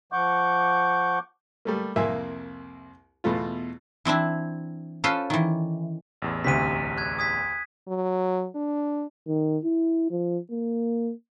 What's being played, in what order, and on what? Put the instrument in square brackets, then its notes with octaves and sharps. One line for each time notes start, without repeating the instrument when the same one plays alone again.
[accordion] F3 F#5 C#6 D6 G6
[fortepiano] G3 A3 A#3
C2 F2 A#3 E5 G#5
E2 B2 A3 F4
[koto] E3 C4 D4 E4
C#4 F4 A4 B4 C5
D#3 E3
[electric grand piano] A1 E2
[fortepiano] D2 C3 [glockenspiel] B6 D#7
[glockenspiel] F#6 G#6
D#6 G#6 B6
[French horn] F#3
D4
[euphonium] D#3
E4
F3
A#3